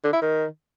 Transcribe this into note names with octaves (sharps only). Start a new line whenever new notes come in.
D3
E4
D#3